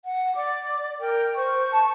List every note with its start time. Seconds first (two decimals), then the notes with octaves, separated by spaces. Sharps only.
0.05 F#5
0.35 D5 D6
1.00 A#4 G5
1.36 C5 C#6
1.71 A5